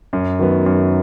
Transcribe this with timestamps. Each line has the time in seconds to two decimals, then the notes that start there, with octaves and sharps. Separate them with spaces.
0.13 F#2
0.39 D#3 F#3 B3
0.66 F#2